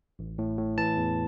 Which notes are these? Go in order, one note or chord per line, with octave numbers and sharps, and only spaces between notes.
A1
A2
A2
E3 A5
E2